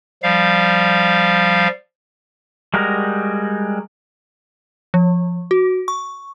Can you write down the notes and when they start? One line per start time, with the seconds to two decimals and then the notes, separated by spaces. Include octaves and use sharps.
0.23 F3 G3 F5
2.74 G3 G#3 F#4 A#4
4.94 F3
5.51 F#4
5.88 C#6